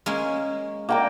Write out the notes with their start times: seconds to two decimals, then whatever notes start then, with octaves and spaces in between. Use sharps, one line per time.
0.06 G#3 A#3 C#4
0.89 A#3 G5 A#5